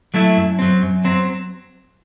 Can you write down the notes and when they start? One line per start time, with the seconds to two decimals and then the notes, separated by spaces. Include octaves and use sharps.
0.14 F#3 A3 E4
0.37 F#2
0.59 F#3 C4
0.82 F#2
1.04 F#3 C4